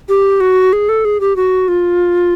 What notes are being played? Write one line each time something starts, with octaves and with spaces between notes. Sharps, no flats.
G4
F#4
G#4
A4
G#4
G4
F#4
F4